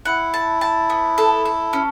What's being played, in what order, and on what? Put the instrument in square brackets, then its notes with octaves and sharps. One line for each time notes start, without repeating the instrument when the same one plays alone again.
[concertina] E4 [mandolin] F#5
[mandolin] A5
A5
B3
A4
A4
C#4